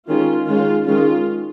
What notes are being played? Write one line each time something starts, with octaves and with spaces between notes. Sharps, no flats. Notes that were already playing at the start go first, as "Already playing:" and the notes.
D#3 G#3 C#4 F4
D#3 G#3 C#4 F4
D#3 G#3 C#4 F4